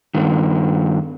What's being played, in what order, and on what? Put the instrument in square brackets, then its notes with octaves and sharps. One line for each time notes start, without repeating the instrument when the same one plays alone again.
[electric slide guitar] G2 D#3